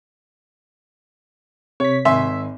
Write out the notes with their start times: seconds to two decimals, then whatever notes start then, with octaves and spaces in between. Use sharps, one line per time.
1.80 C3 C#5 B6
2.05 G#1 E5 G#5 C6